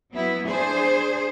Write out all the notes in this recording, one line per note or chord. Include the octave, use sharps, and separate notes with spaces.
F#3 B3 E4
D4 G#4 C5